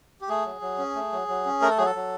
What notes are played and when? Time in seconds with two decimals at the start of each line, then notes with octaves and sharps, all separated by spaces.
0.21 G4
0.29 A3 G#4
0.46 F#3
0.62 F#3
0.78 C#4
0.95 A3
1.12 F#3
1.28 F#3
1.46 C#4
1.62 A3 A#4
1.70 A4
1.78 F#3 G#4
1.86 A4
1.95 F#3